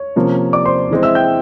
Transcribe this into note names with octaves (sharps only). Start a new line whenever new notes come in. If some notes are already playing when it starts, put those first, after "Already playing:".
Already playing: C#5
C3 F3 A#3 C#4
D5 D6
C5 C6
E3 G#3 C4
E5 E6
G5 G6